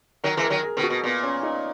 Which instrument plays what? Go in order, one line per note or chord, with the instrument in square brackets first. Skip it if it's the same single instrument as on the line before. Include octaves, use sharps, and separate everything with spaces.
[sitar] D#3 F#3 [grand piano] A#4
[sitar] E3 G#3
[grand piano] A#4
[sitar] D#3 F#3
[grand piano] G#4
[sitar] B2 D#3
[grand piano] F#4
[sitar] B2
[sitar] A#2 [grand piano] B3
[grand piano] C#4
D#4